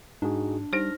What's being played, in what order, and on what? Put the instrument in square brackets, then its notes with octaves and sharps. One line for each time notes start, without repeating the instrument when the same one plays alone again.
[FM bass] G#2 [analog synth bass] D4 [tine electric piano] D#4 F#4 G#4
[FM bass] G3 [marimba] D#4 C5 [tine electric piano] F6 A#6